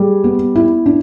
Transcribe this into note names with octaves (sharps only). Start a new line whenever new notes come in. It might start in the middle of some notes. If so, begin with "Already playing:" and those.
Already playing: G3 G#4
B3
E4
D4